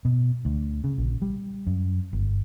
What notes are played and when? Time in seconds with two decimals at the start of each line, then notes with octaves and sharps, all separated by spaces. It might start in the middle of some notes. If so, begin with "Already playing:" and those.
0.05 B2
0.45 D2
0.84 C#3
0.98 A#1
1.22 G3
1.67 F#2
2.13 G1